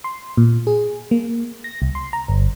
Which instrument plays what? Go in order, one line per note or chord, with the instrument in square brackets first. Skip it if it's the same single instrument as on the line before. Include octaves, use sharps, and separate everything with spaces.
[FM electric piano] C6
A#2
G#4
A#3
A#6
C2
C6
A#5
G1